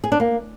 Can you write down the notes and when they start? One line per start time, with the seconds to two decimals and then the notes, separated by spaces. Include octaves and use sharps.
0.04 G#4
0.12 D4
0.20 A#3